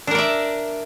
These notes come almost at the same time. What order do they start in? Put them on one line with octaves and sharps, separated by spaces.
D4 A#4 D5 E5